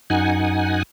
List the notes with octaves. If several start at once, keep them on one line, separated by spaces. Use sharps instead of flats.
F#2 D#4 F#5 G#5